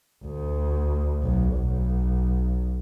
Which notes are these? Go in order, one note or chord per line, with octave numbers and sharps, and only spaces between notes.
D2
B1
B1